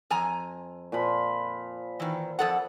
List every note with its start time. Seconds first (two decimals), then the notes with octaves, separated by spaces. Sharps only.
0.10 F2 G#5 A#5
0.92 A#2 F3 B5
2.00 D#3 E3
2.39 F2 A4 F#5